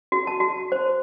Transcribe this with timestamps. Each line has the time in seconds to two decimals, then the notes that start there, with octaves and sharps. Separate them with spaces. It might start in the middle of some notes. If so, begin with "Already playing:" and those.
0.12 F#4
0.27 A5
0.40 F#4
0.72 C5